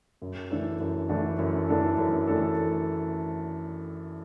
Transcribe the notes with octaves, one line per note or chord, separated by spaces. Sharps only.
F#2
E3 A3 D4 A4
F#2
E3 A3 D4 A4
F#2
E3 A3 D4 A4
F#2
E3 A3 D4 A4